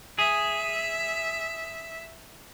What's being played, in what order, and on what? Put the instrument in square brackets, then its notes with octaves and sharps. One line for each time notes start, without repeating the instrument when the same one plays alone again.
[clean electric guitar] G#4 [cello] E5